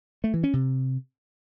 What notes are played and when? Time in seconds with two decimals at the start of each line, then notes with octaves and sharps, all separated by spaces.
0.24 A3
0.34 E3
0.44 C#4
0.53 C3